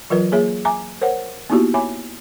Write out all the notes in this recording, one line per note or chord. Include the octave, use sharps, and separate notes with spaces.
E3 F#3 F4 A#4 B4
A#3 G#4 C#5 E5
E5 G#5 A#5 D6
A#4 C5 C#5 F#5
A#3 B3 D#4 E4 F#4 G4
C#5 E5 G#5 B5 D6